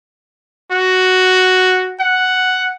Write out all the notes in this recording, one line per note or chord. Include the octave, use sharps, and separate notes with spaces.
F#4
F#5